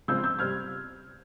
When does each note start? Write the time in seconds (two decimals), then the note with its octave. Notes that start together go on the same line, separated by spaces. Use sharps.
0.08 C#3 F3 G#3 C4 E6 G6
0.24 E6 G6
0.39 C3 G3 C4 F6 G#6